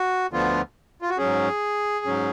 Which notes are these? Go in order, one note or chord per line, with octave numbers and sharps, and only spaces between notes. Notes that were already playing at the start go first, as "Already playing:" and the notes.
Already playing: F#4
D2 D3 F3 B3 F4
F4
F#4
G#2 F#3 C#4 G#4
G#2 F#3 C#4